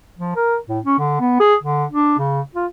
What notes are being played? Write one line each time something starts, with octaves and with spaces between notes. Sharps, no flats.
F3
A#4
A2
C#4
D3
B3
G#4
D3
D4
C#3
F4